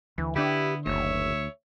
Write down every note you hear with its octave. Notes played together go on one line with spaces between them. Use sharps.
D2 E3
D3 B3 D4 E4 G4
F#1 D2 C#5 E5